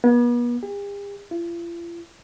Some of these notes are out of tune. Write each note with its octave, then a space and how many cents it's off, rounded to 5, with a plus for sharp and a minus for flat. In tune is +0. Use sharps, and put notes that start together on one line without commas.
B3 -40
G4 +45
F4 -45